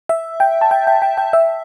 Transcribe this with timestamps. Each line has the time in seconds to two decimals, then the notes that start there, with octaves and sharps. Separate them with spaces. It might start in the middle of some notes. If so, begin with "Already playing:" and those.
0.09 E5
0.40 G5
0.61 A5
0.71 G5
0.87 G5
1.02 G5
1.18 G5
1.33 E5